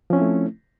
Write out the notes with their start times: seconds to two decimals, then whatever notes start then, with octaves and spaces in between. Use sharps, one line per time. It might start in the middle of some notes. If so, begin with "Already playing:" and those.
0.10 F3
0.13 C#4
0.16 C4
0.19 E4
0.21 A3